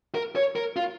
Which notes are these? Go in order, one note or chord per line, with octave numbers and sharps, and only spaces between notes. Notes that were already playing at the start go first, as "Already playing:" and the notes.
A#4
C#5
A#4
F4